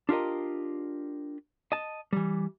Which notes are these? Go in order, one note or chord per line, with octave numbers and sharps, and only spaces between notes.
D4 F4 G4 A#4 D#5
D#5 A5
E3 G3